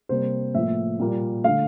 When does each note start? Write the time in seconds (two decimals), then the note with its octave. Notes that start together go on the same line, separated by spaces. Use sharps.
0.09 C3 G3 A#3 C5
0.54 A2 F3 A#3 E5
1.00 A#2 G3 A#3
1.44 D3 A3 F5